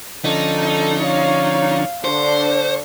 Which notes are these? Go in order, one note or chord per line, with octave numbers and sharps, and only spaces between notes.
D3 F3 C#4 D#4 A4
C#5 F5
D3 D4 C5 C#6